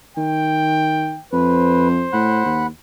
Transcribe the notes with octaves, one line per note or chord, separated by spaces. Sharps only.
D#3 G5
F2 B4 C5
A2 F#5 B5 F#6
D#2